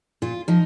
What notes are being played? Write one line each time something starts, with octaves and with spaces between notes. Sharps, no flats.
A#2 F4
F3 D#4